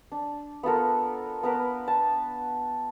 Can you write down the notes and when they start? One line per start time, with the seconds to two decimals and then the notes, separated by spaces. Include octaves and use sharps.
0.12 D4
0.63 B3 F4 A4 A#4
1.43 B3 A#4 B4 D6
1.88 A5